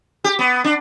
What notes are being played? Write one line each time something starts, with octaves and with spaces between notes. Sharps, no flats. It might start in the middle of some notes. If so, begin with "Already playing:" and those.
G4
B3
D4